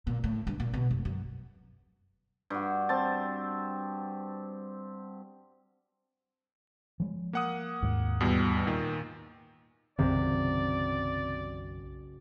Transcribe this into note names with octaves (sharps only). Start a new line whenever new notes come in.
A#2
A2
G2
A#2
B2
F1
F#2
G2 F#4
C4 A5
F3 G#3
A#3 F#5 D#6
D#2 G#2 G#3
E2 B2 G3
A#2 D#3
F#1 B1 F#2 C3 D#3 D5